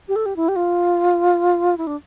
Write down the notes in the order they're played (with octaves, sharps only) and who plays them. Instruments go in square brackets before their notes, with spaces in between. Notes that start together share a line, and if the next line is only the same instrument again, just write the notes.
[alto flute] G4
A4
G4
E4
G4
F4
E4
D4